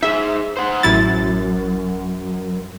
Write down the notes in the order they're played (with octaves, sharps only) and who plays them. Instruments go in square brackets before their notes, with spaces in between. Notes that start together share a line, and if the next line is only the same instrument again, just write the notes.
[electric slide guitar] D#4 G#4 [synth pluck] E5
[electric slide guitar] C5 F#5
[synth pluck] A1 E4 A6 [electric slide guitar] F#2